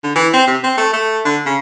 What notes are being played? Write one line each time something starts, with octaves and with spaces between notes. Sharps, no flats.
D3
E3
C4
C3
C4
A3
A3
D3
C#3